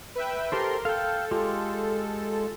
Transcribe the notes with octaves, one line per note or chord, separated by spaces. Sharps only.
B4 E5 G5
G4 A4 A#4 C5 C6
A4 F5 G5
G#3 F4 G4